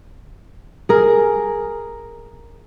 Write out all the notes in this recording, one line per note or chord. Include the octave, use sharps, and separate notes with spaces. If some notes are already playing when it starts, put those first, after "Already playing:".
G#4 A#4